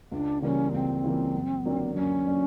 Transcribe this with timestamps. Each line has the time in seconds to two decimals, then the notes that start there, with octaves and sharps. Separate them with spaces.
0.11 C#2 D4
0.42 C#3 E3 G3 A#3 C#4
0.73 C#2 C4
1.04 C#3 E3 G3 A#3
1.34 F#2
1.65 D3 F#3 A#3 D4
1.95 F#2 C#4
2.26 D3 F#3 A#3 D4